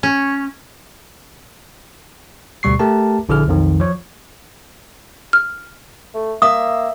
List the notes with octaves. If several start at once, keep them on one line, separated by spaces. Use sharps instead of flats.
C#4
D2 B2 G3 C#6 C7
A3 G4 A#4 A5
A#1 D3 E4 G#4 F6
B1 F2 D#3
F3 C#5
F6
A3
A#3 E5 D#6